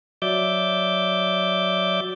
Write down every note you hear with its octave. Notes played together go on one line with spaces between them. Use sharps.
F#3 D5 E5 D6 G6